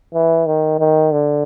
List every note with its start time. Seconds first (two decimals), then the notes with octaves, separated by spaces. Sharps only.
0.14 E3
0.46 D#3
0.79 D#3
1.12 D3